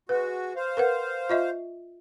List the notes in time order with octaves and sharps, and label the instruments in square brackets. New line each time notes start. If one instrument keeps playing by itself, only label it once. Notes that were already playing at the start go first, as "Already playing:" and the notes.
[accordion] G#3 F#4 [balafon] B4
[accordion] C5 F5
[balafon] A#4 B4 F#5
F4 D#5 E5